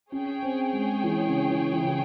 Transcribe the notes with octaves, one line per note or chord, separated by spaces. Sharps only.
C#4 G#4 C#5 G5
C4
G#3
E3
C#3
E3
E3
C#3
E3